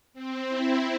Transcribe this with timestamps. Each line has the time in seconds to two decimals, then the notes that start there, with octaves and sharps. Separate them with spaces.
0.13 C4
0.49 E4